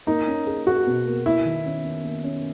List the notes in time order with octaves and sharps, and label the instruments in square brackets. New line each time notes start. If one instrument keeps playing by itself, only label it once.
[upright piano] A#3 [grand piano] D#4
[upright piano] C#4
G#4
[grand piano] F#4 [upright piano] G#4
[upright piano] B2
A#3
[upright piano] A#3 [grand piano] E4
[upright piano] D#3
C#4
C#4
A#3
C#4